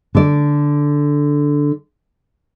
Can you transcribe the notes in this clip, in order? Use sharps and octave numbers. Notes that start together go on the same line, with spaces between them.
D3 D5